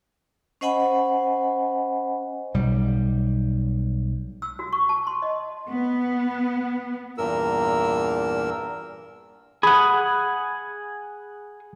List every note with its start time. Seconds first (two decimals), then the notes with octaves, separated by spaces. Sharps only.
0.61 C#4 C5 D#5 F#5 G#5 B5
2.54 B1 G3
4.42 E6
4.59 F#4
4.73 C#6
4.89 A5
5.07 C6
5.22 D#5
5.68 B3
7.18 E2 G2 A#2 A#4 E6
9.63 G#4 F#5 B5 D#6